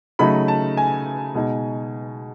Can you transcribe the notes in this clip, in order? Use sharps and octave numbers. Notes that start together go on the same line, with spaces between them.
C#3 F#3 A3 D#4 B5
A5
G#5
B2 G#3 D#4